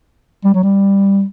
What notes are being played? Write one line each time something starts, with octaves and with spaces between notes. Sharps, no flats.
G3
F#3
G3